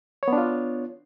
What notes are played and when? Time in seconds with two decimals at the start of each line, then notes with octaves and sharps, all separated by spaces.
0.23 C#5
0.28 B3
0.33 D4
0.38 F4